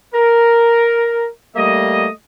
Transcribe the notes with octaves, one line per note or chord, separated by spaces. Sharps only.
A#4
G3 A3 A#3 D#5